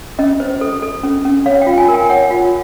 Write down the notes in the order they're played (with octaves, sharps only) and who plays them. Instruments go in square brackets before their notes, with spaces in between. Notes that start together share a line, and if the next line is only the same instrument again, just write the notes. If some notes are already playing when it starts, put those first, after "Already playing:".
[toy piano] C#4 D#5
C5
A4
A4
C#4
C#4
C#5 F5
G5
F4
G#5
A#4
G5
C#5 F#5
F4